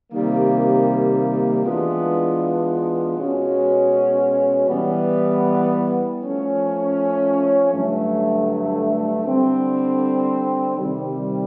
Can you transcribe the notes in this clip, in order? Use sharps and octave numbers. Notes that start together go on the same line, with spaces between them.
C3 D#3 G3 A#3
E3 G#3 B3 D4 F4
B2 G#3 C#4 F#4
E3 G3 B3
F3 A3 C#4
G2 D3 F#3 A3
D3 G3 C4
C3 D#3 G3